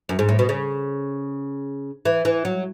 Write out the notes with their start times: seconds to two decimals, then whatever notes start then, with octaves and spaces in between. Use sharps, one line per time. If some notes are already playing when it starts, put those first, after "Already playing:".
0.09 F#2
0.19 G#2
0.29 A2
0.39 B2
0.49 C#3
2.05 E3
2.25 E3
2.45 F#3